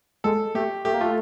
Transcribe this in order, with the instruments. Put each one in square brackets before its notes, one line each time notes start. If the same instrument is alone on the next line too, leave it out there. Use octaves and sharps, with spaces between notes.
[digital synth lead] G#3 [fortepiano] A4
[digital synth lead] A3 [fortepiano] G4
[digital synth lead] A3 [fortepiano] G4
[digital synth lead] A#3
[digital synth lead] A3 [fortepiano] F4